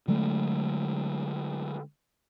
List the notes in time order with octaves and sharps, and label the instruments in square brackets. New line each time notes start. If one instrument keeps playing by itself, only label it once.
[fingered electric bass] D3 F#3 G#3 A3